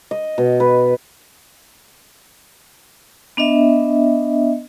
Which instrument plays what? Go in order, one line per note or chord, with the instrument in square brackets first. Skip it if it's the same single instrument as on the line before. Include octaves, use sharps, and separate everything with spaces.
[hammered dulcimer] D#5
B2
B4
[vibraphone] B3 D4 D#5 E5